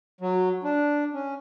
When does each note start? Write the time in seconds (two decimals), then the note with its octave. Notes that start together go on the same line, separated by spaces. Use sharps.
0.21 F#3
0.64 D4
1.13 C#4